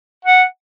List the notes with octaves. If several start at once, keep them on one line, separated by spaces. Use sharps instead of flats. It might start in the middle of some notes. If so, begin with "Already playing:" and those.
F#5